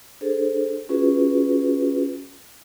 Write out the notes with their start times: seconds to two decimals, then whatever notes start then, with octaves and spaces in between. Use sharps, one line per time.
0.21 D4 G#4 A4 C5
0.89 C#4 F4 F#4 G#4 B4